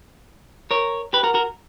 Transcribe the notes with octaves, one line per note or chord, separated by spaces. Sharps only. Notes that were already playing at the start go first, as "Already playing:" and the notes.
A#4 C#5
G4 B4
F#4 A#4
F#4 A#4